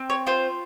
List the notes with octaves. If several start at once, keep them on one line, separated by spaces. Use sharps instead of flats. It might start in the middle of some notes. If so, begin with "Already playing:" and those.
Already playing: C4
C#5
F4 C5